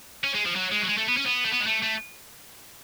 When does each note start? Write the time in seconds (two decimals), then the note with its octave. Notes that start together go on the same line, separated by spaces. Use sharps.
0.24 C#4
0.35 G#3
0.46 F3
0.56 F#3
0.72 G#3
0.82 F#3
0.88 G#3
0.98 A3
1.08 B3
1.17 C#4
1.26 B3
1.44 A3
1.51 B3
1.60 G#3
1.66 A3
1.82 A3